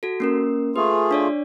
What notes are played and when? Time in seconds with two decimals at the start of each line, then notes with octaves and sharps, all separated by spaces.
0.03 F#4 A4
0.20 A#3 C#4 A#4
0.76 A3 F4 G#4 B4
1.11 D4 C#5 D5